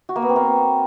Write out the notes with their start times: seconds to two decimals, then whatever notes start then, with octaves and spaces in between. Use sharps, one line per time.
0.09 F#4
0.16 A#3
0.22 B3
0.29 C4
0.36 A#3